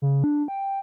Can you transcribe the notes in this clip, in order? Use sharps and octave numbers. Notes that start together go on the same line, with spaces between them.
C#3
D4
G5